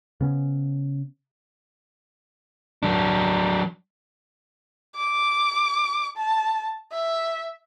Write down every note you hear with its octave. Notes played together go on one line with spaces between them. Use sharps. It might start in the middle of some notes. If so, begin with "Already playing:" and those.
C#3 B3 C#4
F#3 D4
D6
A5
E5